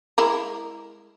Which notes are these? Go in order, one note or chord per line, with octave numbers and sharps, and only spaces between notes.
G#3 E4 A#4